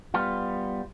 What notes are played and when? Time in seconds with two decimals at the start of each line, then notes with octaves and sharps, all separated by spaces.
0.14 G3 B3 F4